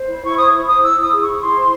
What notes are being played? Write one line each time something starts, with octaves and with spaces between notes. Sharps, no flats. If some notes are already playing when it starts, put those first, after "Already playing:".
Already playing: C5
E4
E4 C#6
C5 D#6
C5
C5 D#6
E4 E6
E4
D#6
G#4
E4 C#6
E4 C6
C5